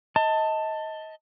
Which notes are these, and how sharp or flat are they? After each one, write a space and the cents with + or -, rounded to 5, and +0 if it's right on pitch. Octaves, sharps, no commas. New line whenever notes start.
D#5 +25 A5 +15